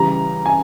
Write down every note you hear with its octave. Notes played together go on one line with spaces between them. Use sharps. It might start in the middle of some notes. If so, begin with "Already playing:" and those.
Already playing: C#3 E3 G3 A#5
G#5